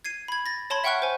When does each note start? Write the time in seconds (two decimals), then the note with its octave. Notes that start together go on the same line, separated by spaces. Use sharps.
0.05 G#6 C7 D#7
0.28 B5 G#6
0.46 A6 A#6
0.70 C#5 A5 B5 C6 G#6
0.84 E5 F#5 G5 C#6 F6 F#6
1.02 C5 G#5